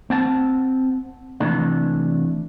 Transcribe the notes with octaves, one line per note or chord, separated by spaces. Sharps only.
C4 F#5 A5
C3 E3 A3 D4